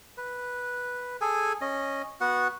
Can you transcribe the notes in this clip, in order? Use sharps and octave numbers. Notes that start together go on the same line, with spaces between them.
B4
G#4 A4 G#5
C#4 D#5
B3 F#4 F#5